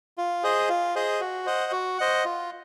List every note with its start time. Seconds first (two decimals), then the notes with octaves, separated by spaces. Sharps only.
0.18 F4
0.43 G#4 C5 D#5
0.69 F4
0.95 G#4 C5 D#5
1.21 F#4
1.46 C5 D#5 F#5
1.72 F#4
1.98 C5 D#5 F#5
2.25 F4